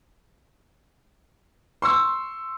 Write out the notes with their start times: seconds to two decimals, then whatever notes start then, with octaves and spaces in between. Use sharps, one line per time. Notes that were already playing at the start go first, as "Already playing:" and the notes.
1.82 C6 C#6 E6